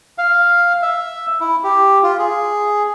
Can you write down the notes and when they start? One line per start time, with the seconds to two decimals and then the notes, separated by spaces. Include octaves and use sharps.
0.18 F5
0.82 E5
1.41 E4
1.64 G4
2.03 F4
2.19 G#4